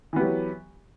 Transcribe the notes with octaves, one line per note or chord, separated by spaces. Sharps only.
E3 F#3 B3 G4